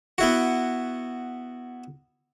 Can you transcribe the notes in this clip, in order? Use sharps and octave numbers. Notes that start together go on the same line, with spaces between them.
B3 E4 F#4